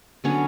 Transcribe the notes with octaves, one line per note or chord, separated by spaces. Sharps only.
D3 F#3 B3 C#4 C#5